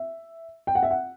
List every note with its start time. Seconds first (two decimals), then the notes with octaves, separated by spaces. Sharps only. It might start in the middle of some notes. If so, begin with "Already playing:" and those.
Already playing: E5
0.67 G5
0.75 F#5
0.83 E5
0.91 F#5